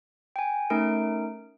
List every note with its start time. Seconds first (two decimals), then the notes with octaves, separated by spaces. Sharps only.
0.36 G5 G#5
0.70 A3 C#4 D#4 A#4 D7